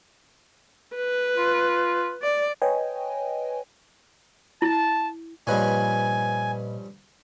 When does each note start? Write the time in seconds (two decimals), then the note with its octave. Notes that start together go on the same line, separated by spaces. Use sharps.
0.96 B4
1.37 F4
2.22 D5
2.62 B4 C#5 D#5 G5 G#5
4.62 E4 A5
5.47 G2 A#2 F3 C#4 B4 D#5 G#5